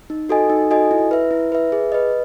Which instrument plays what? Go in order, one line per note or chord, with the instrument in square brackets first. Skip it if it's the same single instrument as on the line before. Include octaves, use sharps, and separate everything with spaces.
[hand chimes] D#4
F#4 A4 D#5 G#5
D#4
F#4 A4 D#5 G#5
E4
B4 E5
E4
B4 E5
G#4
B4 D#5